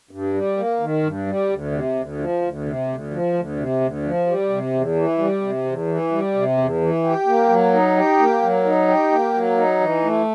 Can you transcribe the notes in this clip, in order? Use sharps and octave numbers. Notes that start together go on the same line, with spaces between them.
G2
G3
A#3
D#3
G2
G3
D2
C3
D2
F3
D2
C3
D2
F3
D2
C3
D2
F3
G3
C3
E2
E3
G3
C3
E2
E3
G3
C3
E2
E3
G4
A#3
F#3
D#4
G4
A#3
F#3
D#4
G4
A#3
F#3
D#4
E3
A3